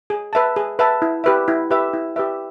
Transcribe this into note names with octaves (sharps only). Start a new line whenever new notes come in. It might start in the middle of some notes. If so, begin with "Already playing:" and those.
G#4
B4 E5 A5
G#4
B4 E5 A5
E4
G4 B4 E5
E4
G4 B4 E5
E4
G4 B4 E5